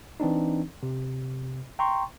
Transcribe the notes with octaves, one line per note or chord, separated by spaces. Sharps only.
E3 C4 D4 D#4
C3
G5 A#5 C6 C#6